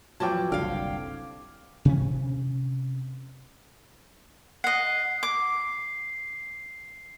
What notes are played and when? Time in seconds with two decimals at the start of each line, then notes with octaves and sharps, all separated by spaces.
0.20 E2 F3 F#3 G5 A5 D6 G#6
0.52 F#1 C2 D3 F5 G5 F6
1.85 C3 C#4
4.64 D#5 F#5 C7
5.23 D6